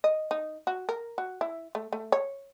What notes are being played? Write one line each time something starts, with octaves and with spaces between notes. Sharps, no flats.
D#5
D#4
F#4
A#4
F#4
E4
A3
A3
C#5